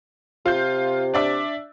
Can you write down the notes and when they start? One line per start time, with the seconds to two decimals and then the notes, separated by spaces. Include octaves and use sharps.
0.46 C3 F4 G6
1.14 D4 D5 E5